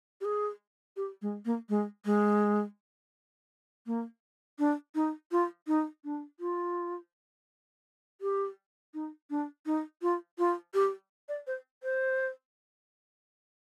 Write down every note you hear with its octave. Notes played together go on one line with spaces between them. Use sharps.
G4
G#4
G4
G#3
A#3
G#3
G#3
A#3
D4
D#4
F4
D#4
D4
F4
G4
D#4
D4
D#4
F4
F4
G4
D5
C5
C5